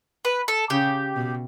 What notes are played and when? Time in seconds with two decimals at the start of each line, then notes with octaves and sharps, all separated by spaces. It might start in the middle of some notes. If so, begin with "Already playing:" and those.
0.25 B4
0.48 A4
0.70 C#3 G4
1.16 B2